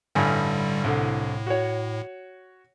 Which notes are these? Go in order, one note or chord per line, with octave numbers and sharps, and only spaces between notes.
A1 G2 D3 G3 G#5
C2 A2 D3
F#4 C#5